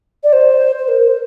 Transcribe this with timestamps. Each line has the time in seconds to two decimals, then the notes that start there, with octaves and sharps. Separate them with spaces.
0.24 D5
0.33 C5
0.79 C5
0.88 A#4
1.08 C5